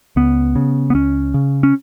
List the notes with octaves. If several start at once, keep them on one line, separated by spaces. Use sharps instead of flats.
C#2 B3
C#3
B3
C#2 C#4
C#3
C#4